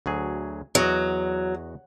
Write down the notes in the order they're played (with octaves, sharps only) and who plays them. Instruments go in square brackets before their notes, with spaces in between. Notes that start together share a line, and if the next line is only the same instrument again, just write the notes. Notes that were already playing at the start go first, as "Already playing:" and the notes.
[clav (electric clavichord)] D2 F#3 G#4
[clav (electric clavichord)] E2 F#4 D#5 [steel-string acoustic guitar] F#3